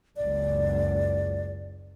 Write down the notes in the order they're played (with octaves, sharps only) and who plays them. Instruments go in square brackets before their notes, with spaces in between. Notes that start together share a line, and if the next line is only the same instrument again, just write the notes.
[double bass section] F#1 C#2 F#2 [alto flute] D5